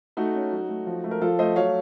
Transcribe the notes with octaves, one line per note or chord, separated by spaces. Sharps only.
A3 D#4 F#4
C#4
F#3
A3
F3
A3
A#4
F3 F4 A4
A3 C5 D#5
F#3 C#5 F5